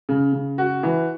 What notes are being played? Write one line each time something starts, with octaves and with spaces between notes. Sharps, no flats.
C#3
C#3
F#4
E3